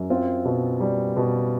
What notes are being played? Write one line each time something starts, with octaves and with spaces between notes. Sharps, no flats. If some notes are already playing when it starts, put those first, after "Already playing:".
Already playing: F#2
C4 F4
B2
G3
B2